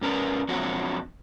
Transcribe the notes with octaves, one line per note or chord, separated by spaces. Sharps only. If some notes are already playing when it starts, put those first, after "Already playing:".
G2 C#4 A#4 B4 D5
F3 F#3 C4 D4 F#4 C#5